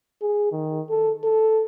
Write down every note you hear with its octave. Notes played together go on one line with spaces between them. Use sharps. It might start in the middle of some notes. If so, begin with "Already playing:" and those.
G#4
D#3
A4
A4